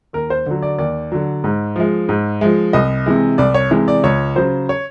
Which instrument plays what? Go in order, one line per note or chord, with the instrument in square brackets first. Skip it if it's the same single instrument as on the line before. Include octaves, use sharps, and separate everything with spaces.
[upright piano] D#2 A#4
C5
D3 F#3
D5
D#2 D5
D3 F#3
G#2
F3 G#3
G#2
F3 G#3
C2 D#5
C3 E3 G#3
C2 D5
C#5
C3 E3 G#3
D5
C#2 C#5
C#3 F#3 C5
C#5